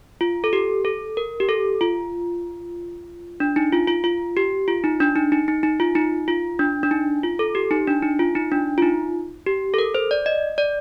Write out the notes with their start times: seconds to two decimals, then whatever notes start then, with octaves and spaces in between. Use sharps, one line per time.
0.21 F4
0.44 A4
0.53 G4
0.85 A4
1.17 A#4
1.40 G4
1.49 A4
1.81 F4
3.40 D4
3.56 D#4
3.72 F4
3.88 F4
4.04 F4
4.37 G4
4.68 F4
4.84 D#4
5.00 D4
5.16 D#4
5.32 D#4
5.48 D#4
5.63 D#4
5.80 F4
5.95 D#4
6.28 F4
6.59 D4
6.83 D4
6.91 D#4
7.23 F4
7.39 A4
7.55 G4
7.71 D#4
7.87 D4
8.02 D#4
8.19 F4
8.35 D#4
8.52 D4
8.78 F4
8.82 D#4
9.46 G4
9.74 A4
9.78 A#4
9.95 C5
10.11 D5
10.26 D#5
10.58 D5